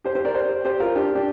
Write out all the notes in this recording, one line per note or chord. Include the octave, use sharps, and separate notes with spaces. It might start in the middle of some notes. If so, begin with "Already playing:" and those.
G4 C5
G4 C5
A#4 D5
G4 C5
G4 C5
F4 A#4
D4 G4
D4 G4